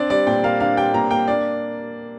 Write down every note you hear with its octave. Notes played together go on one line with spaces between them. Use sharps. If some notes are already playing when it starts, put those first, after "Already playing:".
Already playing: C4 D4 D5
G3 D5
A#2 G5
A#3 F5
D4 F5
G3 G5
A#2 A#5
A#3 G5
D4 D5